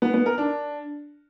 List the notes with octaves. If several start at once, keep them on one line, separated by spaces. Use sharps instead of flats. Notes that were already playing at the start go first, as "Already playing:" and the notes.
B3
B3
A#4
D4